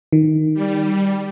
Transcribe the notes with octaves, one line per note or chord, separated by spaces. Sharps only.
D#3
G3